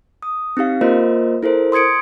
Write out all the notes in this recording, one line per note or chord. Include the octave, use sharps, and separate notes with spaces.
D#6
C4 D#4 G4 F5
A#3 F4 A#4 C5 D#5
E4 A4 A#4 C5
C6 D#6 G#6 C#7 D7